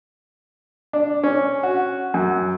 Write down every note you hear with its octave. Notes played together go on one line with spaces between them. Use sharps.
D4
C#4
F#4
F#2